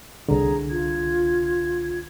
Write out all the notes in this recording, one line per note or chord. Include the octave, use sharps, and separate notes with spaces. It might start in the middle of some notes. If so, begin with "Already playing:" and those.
C2 D3 G#4 A#5
F4 G#6